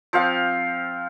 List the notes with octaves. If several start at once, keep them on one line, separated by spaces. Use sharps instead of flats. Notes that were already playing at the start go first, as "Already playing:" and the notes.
F3 C4 F5